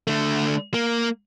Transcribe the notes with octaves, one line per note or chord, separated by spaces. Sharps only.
D3 A3
A#3